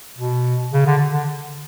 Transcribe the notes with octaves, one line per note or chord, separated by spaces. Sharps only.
B2
C#3
D3
D3